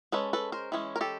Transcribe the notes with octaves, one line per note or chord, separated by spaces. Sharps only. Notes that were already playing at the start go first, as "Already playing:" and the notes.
G#3 C#4 A4 B4
A4 B4
A#4 C5
E3 G#3 C#4
A#4
G4 A4